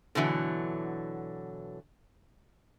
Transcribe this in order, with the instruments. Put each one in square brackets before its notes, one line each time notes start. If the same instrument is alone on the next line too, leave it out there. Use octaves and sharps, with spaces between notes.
[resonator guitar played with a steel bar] B2 D3 E3 F#3